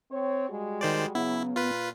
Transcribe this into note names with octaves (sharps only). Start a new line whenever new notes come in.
C4 C#5
G3 G#3 F#4
D#3 C5 D5
C#3 F#3 B3 C#4 E4
A#2 F4 B4